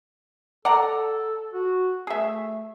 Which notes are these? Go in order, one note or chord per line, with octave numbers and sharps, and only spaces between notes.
A4 D5 F#5 A#5
F#4
A3 G#4 E5